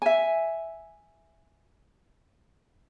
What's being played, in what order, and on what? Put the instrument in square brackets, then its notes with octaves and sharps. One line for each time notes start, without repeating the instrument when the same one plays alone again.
[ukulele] E5 G#5